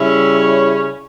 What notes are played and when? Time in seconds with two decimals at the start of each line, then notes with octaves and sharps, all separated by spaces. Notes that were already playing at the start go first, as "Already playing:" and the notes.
Already playing: C#3 G3 C#4 E4 E5
0.35 C#5